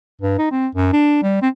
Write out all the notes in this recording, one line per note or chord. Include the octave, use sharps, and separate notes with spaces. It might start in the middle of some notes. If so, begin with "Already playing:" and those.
G2
D#4
C4
F#2
D4
G3
C4